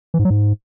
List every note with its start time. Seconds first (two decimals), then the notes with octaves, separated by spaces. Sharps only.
0.14 E3
0.19 G#2
0.25 F#3
0.30 G#2